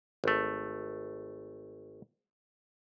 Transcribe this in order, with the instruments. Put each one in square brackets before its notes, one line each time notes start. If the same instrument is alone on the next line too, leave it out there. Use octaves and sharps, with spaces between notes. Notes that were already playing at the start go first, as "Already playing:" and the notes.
[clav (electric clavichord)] G#1 A3